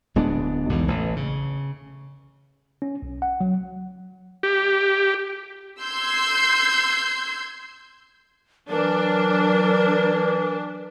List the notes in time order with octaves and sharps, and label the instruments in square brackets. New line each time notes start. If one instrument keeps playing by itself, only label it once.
[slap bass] D1 G#3 B3 D4
B1 E2 B2 E3
A1
C#3
[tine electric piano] C#4
B1
F#5
F#3
[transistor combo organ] G4
[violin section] C6 E6 G6 G#6 C7
[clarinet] E3 [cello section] F#3 [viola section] D4 [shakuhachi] A#4